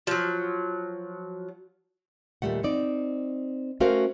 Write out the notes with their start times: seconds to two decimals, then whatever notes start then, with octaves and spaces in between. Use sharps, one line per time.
0.07 F3 F#3
2.42 D#2 A#2 G3 A3 F#5
2.63 C4 D#4 D5
3.80 A3 C#4 F#4 A#4 C5 F5